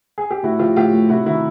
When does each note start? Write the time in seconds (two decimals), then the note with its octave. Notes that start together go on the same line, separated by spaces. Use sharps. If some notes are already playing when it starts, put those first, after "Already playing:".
0.18 G#4
0.31 G4
0.43 A2 E4 F#4
0.59 F3 F4 G4
0.76 A2 F4 G4
0.93 A3
1.09 C3 E4 F#4
1.26 D#3 E4 F#4